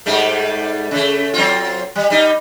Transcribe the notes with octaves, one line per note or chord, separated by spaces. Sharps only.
G#2 G3 A3
C#3 A3
F#3 C4 F4
G3
G3 D#4